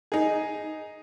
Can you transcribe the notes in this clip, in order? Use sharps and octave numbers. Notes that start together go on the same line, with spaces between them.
D#4 G#4